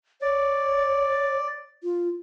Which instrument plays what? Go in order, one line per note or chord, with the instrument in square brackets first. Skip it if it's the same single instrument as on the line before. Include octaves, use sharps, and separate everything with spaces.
[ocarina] C#5 [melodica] D5
[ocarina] F4